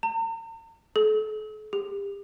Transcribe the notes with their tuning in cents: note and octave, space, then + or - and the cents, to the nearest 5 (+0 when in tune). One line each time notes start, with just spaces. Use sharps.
A#5 -45
A4 -45
G4 +35